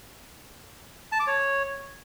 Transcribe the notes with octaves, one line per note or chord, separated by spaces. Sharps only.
A5
D6
C#5